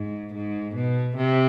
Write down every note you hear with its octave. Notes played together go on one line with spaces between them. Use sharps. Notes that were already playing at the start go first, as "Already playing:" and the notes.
Already playing: G#2
G#2
B2
C3